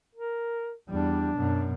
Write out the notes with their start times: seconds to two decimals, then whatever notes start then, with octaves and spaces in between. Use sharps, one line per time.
0.15 A#4
0.89 E2 G3 D4
1.36 F#2 B2